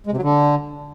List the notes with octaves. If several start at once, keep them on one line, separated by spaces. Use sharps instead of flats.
G#3
C3
F#3
D3